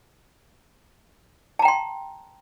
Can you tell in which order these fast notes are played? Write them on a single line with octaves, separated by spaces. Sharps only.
A5 A#5 G5 C6